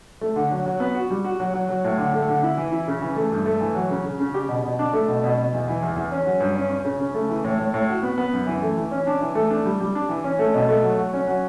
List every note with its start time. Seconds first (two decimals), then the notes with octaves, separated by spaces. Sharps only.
0.21 A3
0.36 D3
0.51 F#3
0.66 F#3
0.80 B3
0.95 F#4
1.10 G3
1.24 F#4
1.40 F#3
1.54 F#3
1.69 F#3
1.84 A2
1.98 D3
2.14 A3
2.28 D3
2.43 E4
2.57 E3
2.72 E4
2.88 C#3
3.02 E3
3.16 A3
3.32 G2
3.46 A3
3.60 E3
3.75 F#3
3.90 C#3
4.06 C#3
4.19 C#3
4.34 G4
4.49 B2
4.64 B2
4.79 D4
4.93 A3
5.08 B2
5.24 B2
5.38 B2
5.53 E2
5.68 E3
5.82 E2
5.96 E2
6.12 C#4
6.26 F#3
6.40 G2
6.56 C#4
6.70 C#4
6.85 C#3
6.99 C#3
7.14 A3
7.29 E3
7.44 A2
7.59 A2
7.74 A2
7.88 F#4
8.03 B3
8.18 B3
8.33 F#2
8.47 E3
8.62 A3
8.77 E3
8.91 C#4
9.07 D4
9.20 E3
9.35 A3
9.51 D4
9.66 G3
9.81 G3
9.95 D4
10.09 E3
10.24 C#4
10.39 A3
10.54 B2
10.69 A3
10.83 F#3
10.97 F#3
11.13 C#4
11.27 F#3